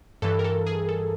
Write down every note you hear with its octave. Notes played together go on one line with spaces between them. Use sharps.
G2 E3 A4
A#4
A4
G#4
A4